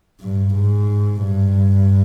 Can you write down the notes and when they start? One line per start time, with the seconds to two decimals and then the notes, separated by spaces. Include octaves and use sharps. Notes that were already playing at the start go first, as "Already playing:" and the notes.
0.21 G2
0.55 G#2
1.24 G2